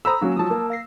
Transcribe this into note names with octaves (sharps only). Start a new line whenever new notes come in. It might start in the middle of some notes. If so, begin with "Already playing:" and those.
A4 C5 A#5 B5 D#6 E6
F#3 A#3 C#4 F#4
F3 F#3 A5 D#6
A#3
F5 A#6 C7